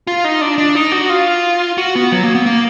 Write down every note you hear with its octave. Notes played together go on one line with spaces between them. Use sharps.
F4
D#4
D4
D4
D#4
F#4
F4
F#4
B3
F#3
A#3
B3
A#3